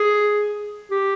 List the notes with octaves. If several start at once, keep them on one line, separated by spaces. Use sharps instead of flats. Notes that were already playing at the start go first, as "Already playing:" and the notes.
Already playing: G#4
G4